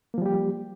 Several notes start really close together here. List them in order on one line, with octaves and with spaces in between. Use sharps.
A#3 F3 G3 G4